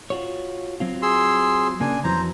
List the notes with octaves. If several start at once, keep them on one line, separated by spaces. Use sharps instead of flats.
F4 F#4 C#5
F#3 C4 F4
G#4 C6 E6
C#3 A#3 D4 G#5
F2 E3 F#3 C5 A#5